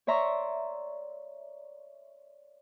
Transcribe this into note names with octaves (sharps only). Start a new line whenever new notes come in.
C#5 D5 E5 A#5 C6 C#6